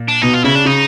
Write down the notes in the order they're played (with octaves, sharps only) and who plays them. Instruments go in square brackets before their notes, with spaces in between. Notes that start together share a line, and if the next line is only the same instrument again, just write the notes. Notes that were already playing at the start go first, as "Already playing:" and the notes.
Already playing: [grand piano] A#2
[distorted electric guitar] D4
[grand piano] B2 [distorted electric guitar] D#4
[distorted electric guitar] F4
[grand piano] C#3 [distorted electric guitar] E4
[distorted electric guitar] D4
[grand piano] C#3 [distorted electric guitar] D#4